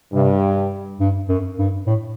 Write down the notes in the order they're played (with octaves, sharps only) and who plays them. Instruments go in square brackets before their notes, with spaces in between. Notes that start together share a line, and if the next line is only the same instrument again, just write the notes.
[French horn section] G2 [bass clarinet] C3
[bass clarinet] G2
F#2
G2
A2